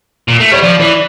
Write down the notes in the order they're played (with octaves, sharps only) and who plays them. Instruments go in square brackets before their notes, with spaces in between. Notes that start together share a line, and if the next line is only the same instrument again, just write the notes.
[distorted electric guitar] A#2
A3
[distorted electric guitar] G3 [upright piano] C#5
[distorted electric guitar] F3 [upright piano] D5
[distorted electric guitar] E3 [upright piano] D5